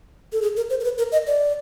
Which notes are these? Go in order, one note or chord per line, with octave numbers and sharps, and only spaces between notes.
A4
G#4
A#4
C5
A#4
B4
A#4
D#5
D5